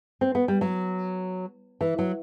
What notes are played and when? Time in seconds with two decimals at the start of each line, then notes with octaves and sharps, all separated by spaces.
0.21 C4
0.35 B3
0.48 G3
0.61 F#3
1.81 E3
1.99 F#3